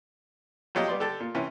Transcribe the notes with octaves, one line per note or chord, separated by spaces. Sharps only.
F2 F#3 G4 D#5
G3 B3 D5 C6
D3 G4 A4
A#2
C3 E3 C#4